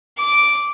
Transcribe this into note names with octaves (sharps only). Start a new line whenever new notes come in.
D6